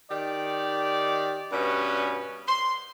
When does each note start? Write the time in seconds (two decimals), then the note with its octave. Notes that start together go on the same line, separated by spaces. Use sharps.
0.11 D#3 G4 D5
1.52 G2 B2 C#4 B4
2.48 C6